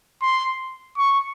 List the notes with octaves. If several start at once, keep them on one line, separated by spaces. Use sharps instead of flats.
C6
C#6